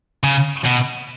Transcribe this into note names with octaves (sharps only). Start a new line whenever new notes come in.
C#3
B2